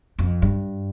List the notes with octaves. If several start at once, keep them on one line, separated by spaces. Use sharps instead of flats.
F2
G2